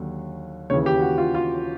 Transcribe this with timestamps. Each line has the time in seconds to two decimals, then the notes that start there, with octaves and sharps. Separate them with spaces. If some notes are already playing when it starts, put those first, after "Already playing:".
Already playing: D#2 D3 F#3
0.70 D#2 C#3 E3 C#5
0.86 G4
1.01 F#4
1.18 F4
1.35 F4